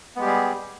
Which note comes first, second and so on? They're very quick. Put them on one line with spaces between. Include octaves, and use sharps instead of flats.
B3 G#3 G4 G3 G#4